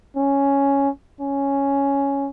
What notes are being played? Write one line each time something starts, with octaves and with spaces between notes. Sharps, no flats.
C#4
C#4